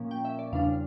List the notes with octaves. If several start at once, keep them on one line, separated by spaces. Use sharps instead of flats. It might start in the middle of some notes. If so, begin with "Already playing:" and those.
Already playing: A#2 F3 A#3 C#4
G5
E5
D5
E2 C#3 G3 D4 F5